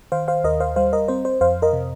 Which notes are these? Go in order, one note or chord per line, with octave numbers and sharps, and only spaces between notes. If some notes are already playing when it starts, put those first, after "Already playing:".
D#3 C5 F5
C5 F5
D#2 A#4 D#5
C5 F5
G3 C5 F5
A#4 D#5
C4 C5
C5
F2 C5 F5
A#4 D#5
C3